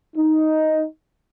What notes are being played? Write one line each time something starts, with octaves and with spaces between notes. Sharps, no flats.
D#4